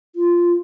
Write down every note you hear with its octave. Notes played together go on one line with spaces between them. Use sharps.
F4